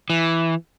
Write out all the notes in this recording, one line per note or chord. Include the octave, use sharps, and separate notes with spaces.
E3